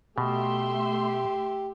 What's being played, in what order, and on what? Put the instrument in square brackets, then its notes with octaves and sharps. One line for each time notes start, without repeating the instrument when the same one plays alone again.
[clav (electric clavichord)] B2 [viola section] A3 E5 C6 [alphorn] G4